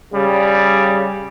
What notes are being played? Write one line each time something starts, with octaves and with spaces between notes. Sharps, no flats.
C#3 G3